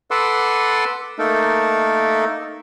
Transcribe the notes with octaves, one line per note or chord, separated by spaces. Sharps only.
A4 B4 F#5 C6 D6 E6
A3 A#3 D#4 A4 A#4